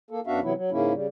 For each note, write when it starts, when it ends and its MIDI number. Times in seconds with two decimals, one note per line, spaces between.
0.11 0.20 58
0.11 0.20 69
0.27 0.40 42
0.27 0.40 59
0.27 0.40 62
0.27 0.40 66
0.27 0.40 76
0.27 0.40 77
0.43 0.53 48
0.43 0.53 52
0.43 0.53 54
0.43 0.53 59
0.43 0.53 64
0.56 0.70 54
0.71 0.93 44
0.71 0.93 49
0.71 0.93 58
0.71 0.93 61
0.71 0.93 64
0.93 1.07 49
0.93 1.07 55